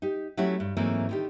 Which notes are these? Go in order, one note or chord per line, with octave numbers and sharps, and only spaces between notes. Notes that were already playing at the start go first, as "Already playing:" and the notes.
D#4 G4
F#3 A3 C#4 E4 F#4 G4
G2
G#2 E3 F#3 A3 A#3 C4
D3 D#3 G4